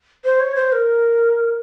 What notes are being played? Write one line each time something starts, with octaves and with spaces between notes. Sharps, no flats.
C5
C#5
C5
A#4